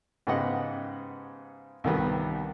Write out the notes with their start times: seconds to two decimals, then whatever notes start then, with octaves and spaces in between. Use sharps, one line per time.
0.27 G#2 C#3 B3 G4 D#5 F#5
1.84 C2 G2 D#3 G3 B3